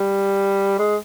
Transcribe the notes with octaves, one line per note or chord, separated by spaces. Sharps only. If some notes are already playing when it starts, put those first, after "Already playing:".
Already playing: G3
G#3